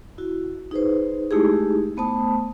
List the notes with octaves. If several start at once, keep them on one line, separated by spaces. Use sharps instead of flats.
E4 F#4
D#4 G#4 B4 C5
G#3 A3 D#4 E4 G4 G#4
A3 B3 C5 A5 D#6